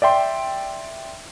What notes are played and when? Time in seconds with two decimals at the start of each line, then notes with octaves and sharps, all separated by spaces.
0.02 D5 E5 G5 C6